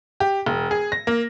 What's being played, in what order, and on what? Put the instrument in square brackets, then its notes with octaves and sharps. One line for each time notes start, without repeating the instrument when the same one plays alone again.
[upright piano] G4
E1
G#4
A#6
A#3